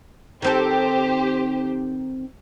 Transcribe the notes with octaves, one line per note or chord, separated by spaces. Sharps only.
D#3 C4 G4 A4 C5